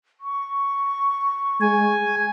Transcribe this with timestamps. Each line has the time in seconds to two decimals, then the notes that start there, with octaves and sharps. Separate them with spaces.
0.21 C#6
1.61 G#3 G#5